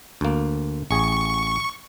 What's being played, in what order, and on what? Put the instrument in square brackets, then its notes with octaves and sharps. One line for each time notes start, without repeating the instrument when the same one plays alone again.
[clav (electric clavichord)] D2 A#3
[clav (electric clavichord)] A1 G#4 [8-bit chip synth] C#6